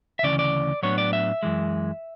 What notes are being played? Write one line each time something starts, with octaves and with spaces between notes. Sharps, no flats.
E5
D2 C#3 E3 C#4 D5
D5
A2 F#3 B3 D4 C#5
D5
E5
F#2 E3 G#3